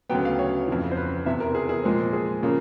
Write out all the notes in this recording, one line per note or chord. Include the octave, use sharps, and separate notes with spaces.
D2 C#3 F#3 B3 G5
F5
C#5
F2 C#3 E3
C5
B4
E2 C3 E3 E5
A#4
G#4
G#4
A#2 F3 G#3 C4
G#4
C#3 F3 A#3